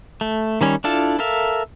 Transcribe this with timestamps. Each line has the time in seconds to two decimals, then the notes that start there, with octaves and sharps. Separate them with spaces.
0.21 A3
0.61 D#3 G3 C#4
0.84 D4 E4 F4 A4 A5
1.19 A4 A#4 E5 F5